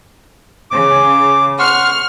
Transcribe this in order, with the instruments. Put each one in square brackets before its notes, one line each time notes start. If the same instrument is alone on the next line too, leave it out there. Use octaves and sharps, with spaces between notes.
[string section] C#3 [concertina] D6
[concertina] F#5 C6 C#6 [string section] F6